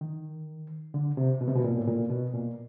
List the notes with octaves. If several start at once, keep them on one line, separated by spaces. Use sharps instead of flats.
D#3
D3
C3
B2
C3
B2
A#2
A2
A#2
B2
A#2